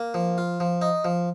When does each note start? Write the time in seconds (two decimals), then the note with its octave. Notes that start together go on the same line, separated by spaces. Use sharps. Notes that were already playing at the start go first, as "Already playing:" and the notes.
Already playing: A#3
0.14 F3
0.38 F4
0.60 F3
0.82 D#4
1.05 F3